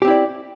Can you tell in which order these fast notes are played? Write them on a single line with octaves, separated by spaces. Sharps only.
G4 C4 E4 D5